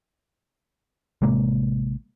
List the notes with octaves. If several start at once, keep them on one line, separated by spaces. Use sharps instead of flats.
A1 C3 G#3 A#3